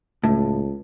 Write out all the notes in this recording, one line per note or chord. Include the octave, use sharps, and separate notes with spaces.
C#2 A2